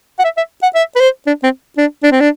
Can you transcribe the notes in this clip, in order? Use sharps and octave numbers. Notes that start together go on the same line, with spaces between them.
F#5
E5
E5
F#5
E5
B4
C5
D4
C4
D4
D4
C4
D4